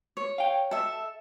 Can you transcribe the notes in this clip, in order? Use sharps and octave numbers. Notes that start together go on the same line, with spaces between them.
C#5
F5 G5
A4 E5